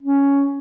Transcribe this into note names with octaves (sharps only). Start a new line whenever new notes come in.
C#4